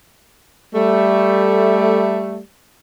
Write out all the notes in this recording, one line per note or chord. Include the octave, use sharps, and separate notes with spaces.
G3 A3